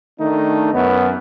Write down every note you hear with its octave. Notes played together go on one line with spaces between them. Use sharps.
D#3 A3 D4 D#4
F#2 B3